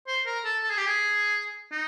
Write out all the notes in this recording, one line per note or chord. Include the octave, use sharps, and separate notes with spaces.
C5
A#4
A4
A4
G#4
G4
G#4
D#4